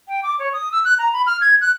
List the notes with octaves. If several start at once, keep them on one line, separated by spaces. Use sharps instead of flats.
G5
D6
C#5
D#6
E6
F#6
A#5
B5
F6
G#6
F#6